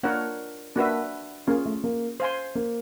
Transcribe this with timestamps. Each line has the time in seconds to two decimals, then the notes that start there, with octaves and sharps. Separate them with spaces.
0.03 A#3 D4 F4 A#4 C#5 F#5
0.76 A#3 D4 F#4 B4 E5
1.47 A#3 C#4 F4 G#4
1.65 A3
1.84 A#3
2.20 C5 F5 G#5 C6
2.55 A#3